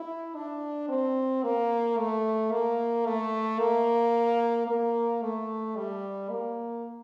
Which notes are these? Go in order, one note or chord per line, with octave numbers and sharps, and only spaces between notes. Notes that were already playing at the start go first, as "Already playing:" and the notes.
Already playing: E4
D4
C4
A#3
A3
A#3
A3
A#3
A#3
A3
G3
A#3